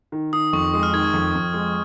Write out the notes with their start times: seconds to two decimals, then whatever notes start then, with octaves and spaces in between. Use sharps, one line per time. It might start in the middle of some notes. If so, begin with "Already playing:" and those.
0.12 D#3
0.33 D#3 D#6
0.53 F2 C#6
0.74 G#3 D#6
0.83 F6
0.93 D#3 G#6
1.04 G#6
1.14 F2
1.35 F2
1.54 G#3